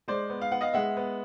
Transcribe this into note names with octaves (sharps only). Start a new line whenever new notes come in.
G#3 C5 D5
B3
F5
B3 F#5
D#5 F5
G#3 E5 F#5
B3